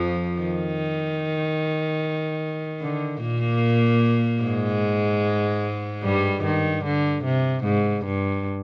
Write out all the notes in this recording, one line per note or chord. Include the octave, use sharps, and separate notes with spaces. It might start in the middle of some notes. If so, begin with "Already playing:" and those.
Already playing: F2 F3
D#3
D3
A#2 A#3
G#2 G#3
G2 G3
D#3
D3
C3
G#2
G2